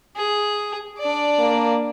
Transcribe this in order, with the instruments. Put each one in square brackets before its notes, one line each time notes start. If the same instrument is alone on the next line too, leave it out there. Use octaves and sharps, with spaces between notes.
[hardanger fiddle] G#4
D4 D5
[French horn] A#3